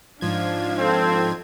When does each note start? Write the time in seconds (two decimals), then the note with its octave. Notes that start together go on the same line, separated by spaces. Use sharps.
0.21 G#2 F3 D4 F5 G#6
0.79 C4 A4